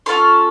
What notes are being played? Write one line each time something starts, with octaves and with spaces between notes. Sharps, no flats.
C#4 F4 A4 C6